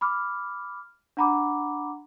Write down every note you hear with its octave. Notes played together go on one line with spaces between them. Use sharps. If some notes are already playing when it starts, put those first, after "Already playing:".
B5 D6 F6
D4 F#5 A#5 B5 D6